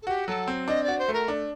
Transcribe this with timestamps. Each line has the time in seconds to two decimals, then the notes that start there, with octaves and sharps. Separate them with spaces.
0.02 A4
0.07 F#4 G4
0.27 F#3 A4
0.48 C4
0.67 D4 D#5
0.83 F#4 D5
0.98 C5
1.08 A3 A#4
1.28 D4